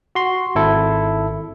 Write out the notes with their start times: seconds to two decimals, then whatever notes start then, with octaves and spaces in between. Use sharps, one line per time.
0.15 F#4 C6
0.55 G#1 E4 A4